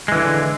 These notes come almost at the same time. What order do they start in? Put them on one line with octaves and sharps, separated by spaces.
G#3 E3 D3